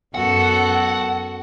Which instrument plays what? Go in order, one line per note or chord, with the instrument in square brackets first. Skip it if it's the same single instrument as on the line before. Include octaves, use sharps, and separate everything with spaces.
[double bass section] F#2 [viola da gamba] B3 F#4 A4 [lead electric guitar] F#5